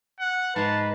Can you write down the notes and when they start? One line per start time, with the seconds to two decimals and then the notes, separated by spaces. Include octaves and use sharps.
0.21 F#5
0.56 G#2 G#3 B4 A5 A#5